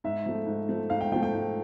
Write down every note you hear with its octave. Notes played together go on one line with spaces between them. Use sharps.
G#2 E5
F3 A3
G#2
F3 A3
G#2 F5
G5
F3 A3 G5
G5
G#2